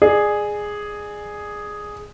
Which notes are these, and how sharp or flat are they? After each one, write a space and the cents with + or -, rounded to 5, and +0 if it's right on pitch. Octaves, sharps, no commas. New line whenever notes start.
G#4 +0 D5 +30